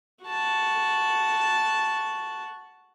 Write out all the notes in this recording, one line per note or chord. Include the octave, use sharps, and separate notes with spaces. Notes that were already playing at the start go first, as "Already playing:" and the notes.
F#4 A5